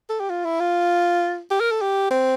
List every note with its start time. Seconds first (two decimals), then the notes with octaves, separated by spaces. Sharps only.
0.09 A4
0.20 G4
0.30 F4
0.45 E4
0.60 F4
1.51 G4
1.60 A#4
1.71 A4
1.81 G4
2.11 C4